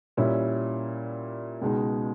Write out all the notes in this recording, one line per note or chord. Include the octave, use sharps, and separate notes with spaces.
A#2 G3 C#4 E4
C#2 B2 G#3 D#4